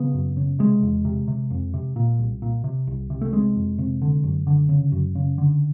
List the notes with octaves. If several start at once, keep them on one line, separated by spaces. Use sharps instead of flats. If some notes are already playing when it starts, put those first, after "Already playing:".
Already playing: C#3 B3
F#2
C#3
C3 G#3
E2
C3
C3
F2
C3
A#2
C2
A#2
C3
C2
C3
A3
C3 G#3
F2
C3
D3
F#2
D3
C#3
F#2
C#3
D3